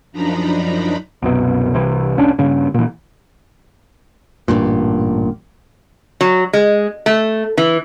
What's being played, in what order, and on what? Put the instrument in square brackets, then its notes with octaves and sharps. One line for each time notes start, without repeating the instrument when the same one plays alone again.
[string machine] F#2 F3 D4 D#4 A#5 B5
[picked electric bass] C2 F#2 B2
C2 C3 E3
F1 C2 C#4 D4
G2 C#3
A#2 E3
A1 G2 A#2
[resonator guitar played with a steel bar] F#3
G#3
A3
E3